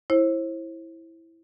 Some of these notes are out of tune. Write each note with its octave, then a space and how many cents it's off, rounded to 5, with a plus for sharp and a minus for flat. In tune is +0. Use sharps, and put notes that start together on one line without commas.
E4 +0 C5 +35